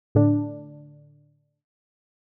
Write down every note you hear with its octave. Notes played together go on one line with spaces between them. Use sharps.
A2 D3 D4